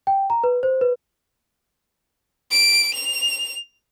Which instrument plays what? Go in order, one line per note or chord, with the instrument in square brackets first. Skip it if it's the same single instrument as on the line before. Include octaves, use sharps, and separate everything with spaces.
[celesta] G5
A#5
B4
C5
B4
[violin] D7
F7